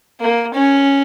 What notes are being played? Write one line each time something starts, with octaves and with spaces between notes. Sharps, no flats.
A#3
C#4